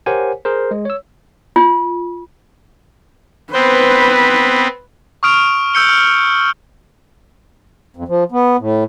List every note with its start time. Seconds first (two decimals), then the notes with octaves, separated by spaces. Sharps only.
0.06 G4 A#4 C5 C#5 F#5 G#5
0.45 G#4 A#4 C5
0.71 G#3
0.85 C#5 E6
1.56 F4
3.53 B3 C4 B4 C5
5.23 C#6 D#6 F6 D7 F7
5.74 E6 G6 C#7 G7
5.88 F6 C#7
7.96 F2
8.08 F3
8.32 B3
8.59 A2